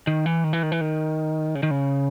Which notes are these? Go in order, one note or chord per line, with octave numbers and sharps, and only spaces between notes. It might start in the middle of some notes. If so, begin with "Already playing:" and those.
D#3
E3
D#3
E3
D#3
E3
D#3
C#3
D#3
C#3